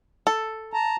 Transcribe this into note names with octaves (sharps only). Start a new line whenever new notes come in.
A4
A5 A#5